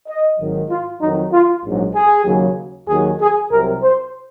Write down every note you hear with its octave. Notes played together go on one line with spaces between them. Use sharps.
D#5
G#1 G#2 D#3 F#3
F4
F2 D#3 F#3 D#4
F4
A#1 G#2 F#3
G#4
D#2 C#3 F#3
D#2 D#3 F#3 G#4
G#4
C2 C3 F#3 A#4
C5